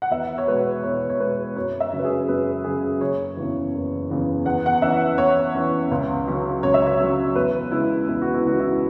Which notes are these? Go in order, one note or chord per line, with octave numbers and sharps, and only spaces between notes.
F#5
E2 E5
C#5
B2 G#3 B4
E2 C#5
C#5
B2 G#3 B4
F#2 C#5
E5
C#3 F#3 C#4
B4
G#4
F#2 B4
C#3 F#3 C#4 G#4
F#1 C#5
E2 C#3 E3
F#1
E2 C#3 E3
E2 F#5
F#5
E3 C#4 E5
E2 C#5
E3 C#4
C#2
C#3 F#3 C#4
C#2 C#5
E5
C#5
C#3 F#3 C#4
E2 B4
C#3 G#3 B3 E4
E2 E4
F#4
E4
C#3 G#3 B3 F#4
E4